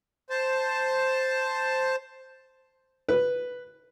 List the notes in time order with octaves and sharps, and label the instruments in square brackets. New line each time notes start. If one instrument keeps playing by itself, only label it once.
[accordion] C5 A5
[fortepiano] B4